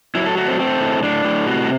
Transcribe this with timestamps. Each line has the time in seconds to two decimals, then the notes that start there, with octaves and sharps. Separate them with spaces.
0.15 F#3 E4
0.26 A4
0.37 A3 F#4
0.48 C4
0.59 A3 C4
0.81 A2
1.03 A2 D4
1.25 A2
1.47 C3 F#4